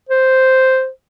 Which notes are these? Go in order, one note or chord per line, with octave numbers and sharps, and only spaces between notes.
C5